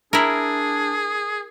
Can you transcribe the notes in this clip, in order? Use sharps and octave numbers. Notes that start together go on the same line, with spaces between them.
D4 E4 G#4 A#4